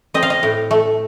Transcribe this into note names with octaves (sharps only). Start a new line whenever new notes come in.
C4 D#5
F5
D#5
A2
A3